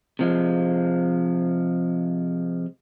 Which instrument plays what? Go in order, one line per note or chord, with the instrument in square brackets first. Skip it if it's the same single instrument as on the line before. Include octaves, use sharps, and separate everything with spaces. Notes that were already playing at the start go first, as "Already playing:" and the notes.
[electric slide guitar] C3 F3 G#3